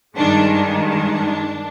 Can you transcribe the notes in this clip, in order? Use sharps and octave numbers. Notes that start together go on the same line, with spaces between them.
G2 D#3 G#3 D4
D4
D4